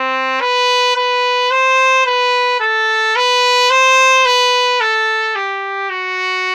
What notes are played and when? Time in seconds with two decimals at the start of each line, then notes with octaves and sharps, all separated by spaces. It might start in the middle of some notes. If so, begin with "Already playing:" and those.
Already playing: C4
0.41 B4
0.96 B4
1.51 C5
2.06 B4
2.60 A4
3.16 B4
3.70 C5
4.25 B4
4.81 A4
5.36 G4
5.90 F#4